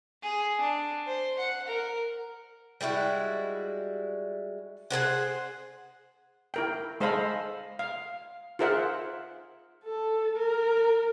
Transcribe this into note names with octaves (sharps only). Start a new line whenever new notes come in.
G#4
D4
C5
F#5
A#4
G3 G#3 E4 F#4
G#4 A4 C5 F#5
E4 A#4 G5
G#3 A4 C5 D#5 F5 B5
F5
F4 G#4 A#4 C5 E5 F#5
A4
A#4